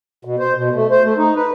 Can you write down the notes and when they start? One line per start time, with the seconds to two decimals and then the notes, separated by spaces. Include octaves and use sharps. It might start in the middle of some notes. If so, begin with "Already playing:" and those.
0.25 B2
0.39 C5
0.55 B2
0.74 A3
0.91 C5
1.04 A3
1.18 D#4
1.36 B4